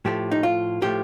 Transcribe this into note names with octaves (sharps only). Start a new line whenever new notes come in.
A2 F3 A3 G4
D#4
F4
A2 F3 A3 G4